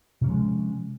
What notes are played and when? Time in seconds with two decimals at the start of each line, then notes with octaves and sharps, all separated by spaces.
0.21 C3
0.24 C#4
0.27 F3
0.30 G#3